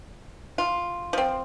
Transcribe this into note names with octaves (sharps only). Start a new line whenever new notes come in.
F4
F3 C4